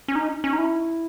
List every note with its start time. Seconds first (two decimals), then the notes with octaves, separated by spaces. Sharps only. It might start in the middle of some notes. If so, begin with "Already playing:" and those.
0.08 C#4
0.16 D#4
0.44 C#4
0.53 D#4
0.58 E4